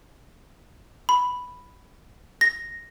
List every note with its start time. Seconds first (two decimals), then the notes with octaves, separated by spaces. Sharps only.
1.09 B5
2.41 A#6